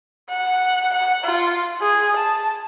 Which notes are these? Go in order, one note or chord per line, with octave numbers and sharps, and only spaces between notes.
F#5
F#5
F4
G#4
A5